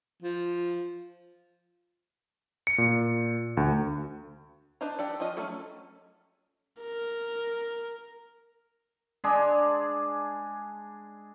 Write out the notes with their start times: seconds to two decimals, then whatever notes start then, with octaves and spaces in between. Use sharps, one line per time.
0.22 F3
2.67 C#7
2.78 A#2
3.57 D2
4.81 D4 B4 C5 D#5 A#5
4.99 D4 G4 A4 D5
5.20 F3 C#4 F4 D#5
5.36 F#3 A3 C#4 A4
6.82 A#4
9.24 G#3 D4 G#4